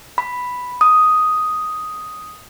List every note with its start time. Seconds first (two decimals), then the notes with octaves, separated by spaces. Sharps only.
0.18 B5
0.81 D#6